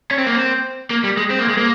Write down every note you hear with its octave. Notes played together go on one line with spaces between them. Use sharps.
C#4
C4
A#3
C4
A#3
G3
G#3
C4
A#3
G#3
A#3